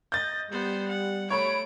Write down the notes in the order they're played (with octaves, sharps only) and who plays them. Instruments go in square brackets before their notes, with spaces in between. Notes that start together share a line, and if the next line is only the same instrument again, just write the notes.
[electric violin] D#5 [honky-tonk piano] G6 A6
[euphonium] G3 [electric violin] B3 C5
[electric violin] F#5
[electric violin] A3 D7 [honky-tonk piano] C#5 B5